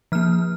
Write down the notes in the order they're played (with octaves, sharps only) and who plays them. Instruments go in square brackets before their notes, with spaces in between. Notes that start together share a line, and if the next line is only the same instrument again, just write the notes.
[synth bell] F3 A#3 F6